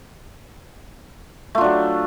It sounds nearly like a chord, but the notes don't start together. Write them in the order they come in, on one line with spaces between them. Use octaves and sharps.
A3 F4 D4 F#3